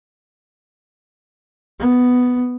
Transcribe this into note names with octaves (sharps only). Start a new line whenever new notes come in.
B3